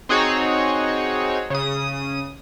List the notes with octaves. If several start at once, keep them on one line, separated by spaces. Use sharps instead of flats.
C4 D#4 F#4 G#4 C#5
C#3 D#6